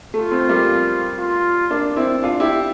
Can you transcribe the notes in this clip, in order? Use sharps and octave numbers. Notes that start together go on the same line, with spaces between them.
A3 F4
A3 C4
G3 A#3
F4
A#3 D4
C4 E4
D4 F4
E4 G4